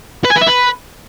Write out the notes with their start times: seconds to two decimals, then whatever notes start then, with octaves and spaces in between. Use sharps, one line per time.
0.25 B4
0.30 G#5
0.36 B4
0.42 E5
0.48 B4